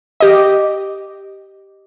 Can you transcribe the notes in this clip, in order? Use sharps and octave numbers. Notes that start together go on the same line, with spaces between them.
G4 D#5